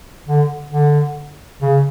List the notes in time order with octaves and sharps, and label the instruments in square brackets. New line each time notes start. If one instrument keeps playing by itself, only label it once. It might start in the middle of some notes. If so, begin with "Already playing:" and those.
[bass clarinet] D3
D3
C#3